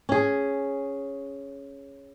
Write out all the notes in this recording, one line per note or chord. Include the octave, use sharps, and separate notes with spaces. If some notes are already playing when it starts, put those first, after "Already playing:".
C#4 G#4